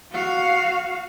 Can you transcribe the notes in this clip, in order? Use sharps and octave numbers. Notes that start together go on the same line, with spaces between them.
F#4 F5